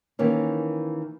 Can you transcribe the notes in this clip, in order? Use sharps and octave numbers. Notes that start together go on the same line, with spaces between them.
D#3 E3 A#3 C#4